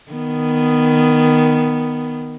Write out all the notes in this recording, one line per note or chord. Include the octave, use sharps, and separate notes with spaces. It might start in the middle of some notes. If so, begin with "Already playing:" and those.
D#3 B3